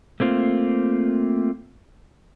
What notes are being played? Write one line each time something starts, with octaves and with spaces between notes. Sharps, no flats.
A3 A#3 C4 F4